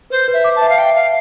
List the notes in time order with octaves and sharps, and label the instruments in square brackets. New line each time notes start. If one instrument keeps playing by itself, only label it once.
[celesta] B4 [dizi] C5
[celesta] B4
[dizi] E5
[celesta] D6
[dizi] A5
[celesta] E5
[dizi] F5
[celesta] E5 [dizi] G5
[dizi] F5 [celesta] A5